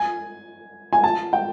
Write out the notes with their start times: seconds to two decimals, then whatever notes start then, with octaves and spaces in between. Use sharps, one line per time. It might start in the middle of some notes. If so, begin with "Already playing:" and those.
Already playing: G#5
0.93 G#5
1.04 A5
1.33 G5